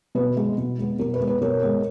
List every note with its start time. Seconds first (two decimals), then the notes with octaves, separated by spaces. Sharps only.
0.15 B2 B4
0.36 G#3 B3
0.58 B2
0.78 G#3 B3
0.99 B2 A#4
1.14 B4
1.21 G#3 B3
1.27 B4
1.41 B2 A#4 C#5
1.63 G#3 B3